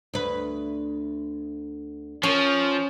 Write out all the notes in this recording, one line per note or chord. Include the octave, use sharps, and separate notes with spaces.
D2 B4
F3 C#4